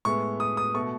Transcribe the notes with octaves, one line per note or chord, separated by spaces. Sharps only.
A2 G#3 B3 C#6
D#6
D#6
B2 A3 C#6